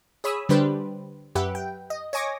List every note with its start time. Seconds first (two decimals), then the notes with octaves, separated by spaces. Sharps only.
0.24 G#4 C#5 B5 D#6 E6
0.49 D3 G3 D4 G4 B4 C5
1.35 F#2 G4 B4 E5 F#5
1.55 G5
1.90 D#5
2.13 C#5 D#5 G#5 C#6 D6 A#6